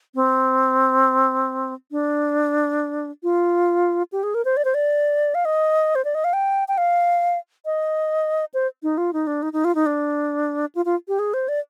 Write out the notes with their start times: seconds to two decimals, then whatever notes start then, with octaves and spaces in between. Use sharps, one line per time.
0.15 C4
1.91 D4
3.23 F4
4.12 G4
4.23 G#4
4.34 A#4
4.45 C5
4.57 D5
4.65 C5
4.74 D5
5.35 F5
5.45 D#5
5.95 C5
6.04 D5
6.15 D#5
6.24 F5
6.33 G5
6.68 G5
6.78 F5
7.65 D#5
8.54 C5
8.83 D#4
8.98 F4
9.13 D#4
9.27 D4
9.42 D#4
9.53 D#4
9.64 F4
9.75 D#4
9.86 D4
10.75 F4
10.85 F4
11.08 G4
11.19 G#4
11.34 C5
11.48 D5